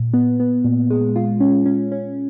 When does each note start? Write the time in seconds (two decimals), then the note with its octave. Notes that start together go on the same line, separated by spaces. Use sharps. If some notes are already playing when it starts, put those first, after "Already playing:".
Already playing: A#2
0.14 B3
0.40 B3
0.64 A#2
0.90 G#3
1.16 F4
1.40 C#4
1.66 C#4
1.92 C#4